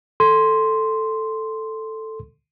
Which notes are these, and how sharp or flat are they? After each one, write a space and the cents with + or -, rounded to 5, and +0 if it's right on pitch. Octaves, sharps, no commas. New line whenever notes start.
A4 +0 C6 +0